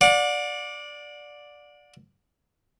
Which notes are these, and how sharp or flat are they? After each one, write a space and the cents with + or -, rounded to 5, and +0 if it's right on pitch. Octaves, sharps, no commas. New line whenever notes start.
D5 +0 F#5 -40